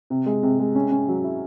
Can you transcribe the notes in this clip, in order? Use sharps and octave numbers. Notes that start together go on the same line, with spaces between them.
C3
G#3
C3
G#3
C#4
C#4
F#3
E4